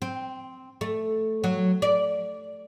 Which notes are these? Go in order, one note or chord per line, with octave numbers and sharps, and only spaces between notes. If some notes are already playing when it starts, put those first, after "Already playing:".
C4
A3
F#3
D5